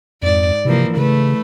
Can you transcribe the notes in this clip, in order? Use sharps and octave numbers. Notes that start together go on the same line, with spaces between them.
F2 G#2 D5
C3 E3 F3 A#3
C#3 A3 B4